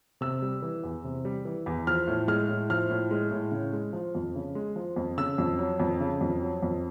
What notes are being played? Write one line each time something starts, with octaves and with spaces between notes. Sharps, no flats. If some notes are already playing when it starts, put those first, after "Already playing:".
C3 E6
G3
E3
E2
C3
G3
E3
E2
F3 F6
A2
G#3 F6
A2
F3 F6
A2
G#3
A2
C#3
G#3
F3
F2
C#3
G#3
F3
F2
C#3 E6
F2
F#3
F2
C#3
F2
F#3
F2